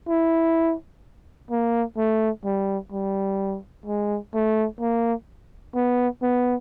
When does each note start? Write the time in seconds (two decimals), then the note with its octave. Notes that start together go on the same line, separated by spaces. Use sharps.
0.08 E4
1.51 A#3
1.97 A3
2.45 G3
2.92 G3
3.86 G#3
4.34 A3
4.80 A#3
5.75 B3
6.22 B3